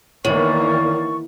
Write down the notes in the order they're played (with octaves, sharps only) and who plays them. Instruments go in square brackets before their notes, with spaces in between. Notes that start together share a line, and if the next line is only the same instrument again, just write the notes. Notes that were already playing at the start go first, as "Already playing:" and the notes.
[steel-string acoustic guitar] E2 [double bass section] D#3 E3 A#3 [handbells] C#5 [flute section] D5 C#6